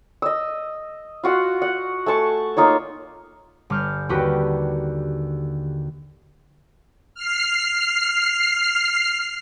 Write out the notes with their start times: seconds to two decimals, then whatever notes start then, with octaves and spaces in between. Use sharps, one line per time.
0.22 D#5 E6
1.24 F4 F#4 F#5
1.62 F#5
2.06 A3 G#5 A5 C#6
2.57 A#3 D#4 F4 C#5
3.70 G1 D6 F6 G6
4.09 D#2 D3 F#4 G4 B4 D6
7.14 F6 C7